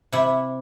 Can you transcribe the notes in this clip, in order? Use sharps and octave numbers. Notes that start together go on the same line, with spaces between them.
C3 E4